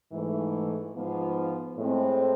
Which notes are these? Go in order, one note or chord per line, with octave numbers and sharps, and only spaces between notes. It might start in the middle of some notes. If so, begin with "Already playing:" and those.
G#2 E3 A3
G#2 F3 B3 F4
A2 G#3 C4